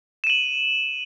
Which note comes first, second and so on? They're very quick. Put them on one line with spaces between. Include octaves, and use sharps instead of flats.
E7 D#7 F#7